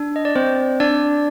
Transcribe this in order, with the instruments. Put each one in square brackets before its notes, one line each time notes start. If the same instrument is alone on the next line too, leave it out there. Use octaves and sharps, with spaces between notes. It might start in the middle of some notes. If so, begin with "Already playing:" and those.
Already playing: [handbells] D4
D#5
D5
C4 C5
D4 D5